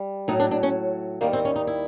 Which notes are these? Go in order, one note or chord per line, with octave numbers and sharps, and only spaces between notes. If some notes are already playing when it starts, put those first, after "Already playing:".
Already playing: G3
A2 F#3 D#4
D4
D4
C#4
D#2 D#3 G3 A#3
C4
C#4
D#4
E4